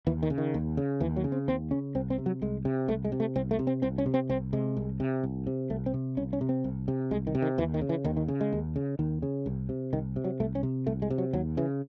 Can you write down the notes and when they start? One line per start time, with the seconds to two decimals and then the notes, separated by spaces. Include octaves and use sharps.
0.07 D#2 E3
0.23 D#3
0.30 C#3
0.38 D#3
0.54 D#2
0.77 C#3
1.01 D#2 E3
1.16 F#3
1.24 C#3
1.32 C4
1.48 D#2 C4
1.71 C#3 C#4
1.95 C2 C4
2.10 C4
2.18 C3
2.26 F#3
2.42 C2 G#3
2.65 C3
2.88 C2 A3
3.05 G#3
3.12 C3
3.20 A3
3.36 C2 C4
3.51 A3
3.59 C3
3.67 C4
3.82 C2 C4
3.98 C#4
4.06 C3
4.14 C4
4.29 C2 C4
4.53 C3 G#3
4.77 C2
5.00 C3
5.23 C2
5.47 C3
5.70 C2 A3
5.86 C4
5.94 C3
6.17 C2 C#4
6.33 C#4
6.41 C3
6.49 C4
6.64 C2
6.88 C3
7.11 C2 G#3
7.27 D#3
7.35 C3
7.42 D#3
7.58 D#2 E3
7.74 D#3
7.81 C#3
7.89 E3
8.04 D#2 D#3
8.17 D#3
8.28 C#3
8.41 G#3
8.53 D#2
8.76 C#3
8.99 D#2 D#3
9.22 C#3
9.46 C2
9.69 C3
9.93 C2 D#3
10.16 C3
10.24 F#3
10.40 C2 A3
10.55 C#4
10.63 C3
10.87 C2 A3
11.02 G#3
11.10 C3
11.18 F#3
11.33 D#2 F#3
11.57 C#3 E3